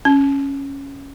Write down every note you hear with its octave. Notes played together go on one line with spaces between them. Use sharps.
C#4